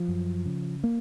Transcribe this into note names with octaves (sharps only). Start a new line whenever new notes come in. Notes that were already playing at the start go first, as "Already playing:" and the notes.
Already playing: F3
F#2
C#3
A#3